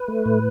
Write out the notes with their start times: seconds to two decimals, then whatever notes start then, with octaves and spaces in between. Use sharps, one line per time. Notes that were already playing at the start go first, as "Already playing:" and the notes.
Already playing: B4
0.08 A3
0.26 A2